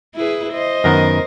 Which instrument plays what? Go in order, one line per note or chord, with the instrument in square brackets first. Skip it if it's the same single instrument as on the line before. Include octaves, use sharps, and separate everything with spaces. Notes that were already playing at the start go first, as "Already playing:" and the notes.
[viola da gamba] E4 G#4 B4
C5 D#5
[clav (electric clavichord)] F#2 D#3 B3 [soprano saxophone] A#4